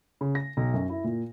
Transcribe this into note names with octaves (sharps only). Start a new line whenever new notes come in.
C#3
A#6
B1
F#2
E4
A#2